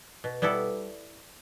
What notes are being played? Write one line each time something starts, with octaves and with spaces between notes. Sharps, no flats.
B2
G3 B3 E4 A4